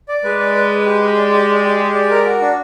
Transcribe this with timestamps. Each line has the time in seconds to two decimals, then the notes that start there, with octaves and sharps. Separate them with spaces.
0.09 D5
0.24 G#3 B4
0.40 D5
0.55 B4
0.70 B4
0.86 G4
1.02 G4
1.17 D5
1.33 G4
1.49 D5
1.64 G4
1.79 G4
1.95 D5
2.11 A#4
2.25 F#4
2.41 D4